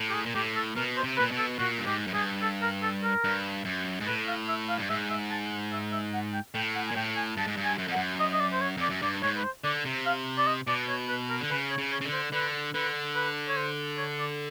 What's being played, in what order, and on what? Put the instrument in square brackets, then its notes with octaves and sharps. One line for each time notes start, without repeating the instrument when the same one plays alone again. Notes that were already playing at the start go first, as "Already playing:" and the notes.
Already playing: [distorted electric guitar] A2
[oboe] G4
G#4
[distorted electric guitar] A#2
[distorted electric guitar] A2 [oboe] G4
[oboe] A4
[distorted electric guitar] B2 [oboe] A#4
[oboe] C5
[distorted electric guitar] C3
[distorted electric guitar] A#2 [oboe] B4
[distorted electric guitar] B2
[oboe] A4
[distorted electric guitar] A#2 [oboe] F#4
[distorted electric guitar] G2
[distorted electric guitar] G#2 [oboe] G4
[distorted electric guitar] F#2
[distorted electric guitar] G2 [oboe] G#4
[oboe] A4
A#4
A4
A#4
[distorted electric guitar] G2
F#2
G#2
[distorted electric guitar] A2 [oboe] B4
[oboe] F5
E5
F5
[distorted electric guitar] G2
[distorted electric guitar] G#2 [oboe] E5
[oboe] E5
A5
E5
E5
F#5
G5
[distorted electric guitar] A2 [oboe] G5
[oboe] F#5
G#5
[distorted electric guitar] A#2
[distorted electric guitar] A2 [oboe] G5
[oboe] G#5
[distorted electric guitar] G2 [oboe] A5
[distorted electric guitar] G#2
G2
[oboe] G#5
[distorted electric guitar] F#2
F2
[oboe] F#5
[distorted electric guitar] F#2
[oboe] D#5
D#5
D5
C5
C#5
[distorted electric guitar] F2 [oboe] D5
[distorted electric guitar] F#2
[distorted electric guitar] G2 [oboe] D5
[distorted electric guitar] G#2 [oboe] C#5
[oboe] B4
C5
[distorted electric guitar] D3 [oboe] D5
[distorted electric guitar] C3
[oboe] F5
D5
D#5
[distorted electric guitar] B2 [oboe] D5
[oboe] C#5
B4
A#4
[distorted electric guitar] D3
[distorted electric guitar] C#3 [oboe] B4
[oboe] C#5
[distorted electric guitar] C#3
[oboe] C#5
[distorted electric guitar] C#3
D3
[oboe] C5
[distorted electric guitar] D3 [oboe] B4
[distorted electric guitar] D3 [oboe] B4
[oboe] B4
C#5
C5
C#5
D5